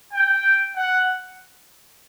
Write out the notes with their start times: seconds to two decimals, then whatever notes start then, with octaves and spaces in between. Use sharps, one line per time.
0.14 G5
0.76 F#5